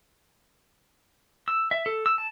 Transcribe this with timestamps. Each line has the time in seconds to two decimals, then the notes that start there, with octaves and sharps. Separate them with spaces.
1.48 E6
1.71 E5
1.86 A4
2.06 E6
2.18 A5